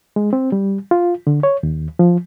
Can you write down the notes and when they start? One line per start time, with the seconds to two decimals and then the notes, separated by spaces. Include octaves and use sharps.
0.16 G#3
0.33 C4
0.52 G3
0.91 F4
1.27 D3
1.43 C#5
1.63 D#2
1.99 F3